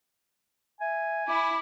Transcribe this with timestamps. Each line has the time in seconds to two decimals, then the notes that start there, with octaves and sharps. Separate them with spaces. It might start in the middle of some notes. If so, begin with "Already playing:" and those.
0.81 E5 G#5
1.28 E4 D6